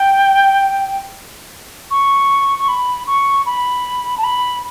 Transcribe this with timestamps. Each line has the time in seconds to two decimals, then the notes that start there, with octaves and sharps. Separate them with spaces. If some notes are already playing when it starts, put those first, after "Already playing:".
Already playing: G5
1.91 C#6
2.59 C#6
2.68 B5
3.07 C#6
3.46 B5
4.18 A5
4.24 B5